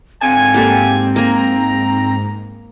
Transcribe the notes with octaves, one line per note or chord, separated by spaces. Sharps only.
G#2 D3 C4 F4 G#5
A#3 G4 A4
A#3 G#5 A#5